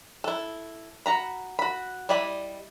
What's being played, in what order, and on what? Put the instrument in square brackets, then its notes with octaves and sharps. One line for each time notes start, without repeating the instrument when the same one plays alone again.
[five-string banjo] E4 A4
F#4 A#5 B5
F#4 B5
G3 E4 D5 D#5 B5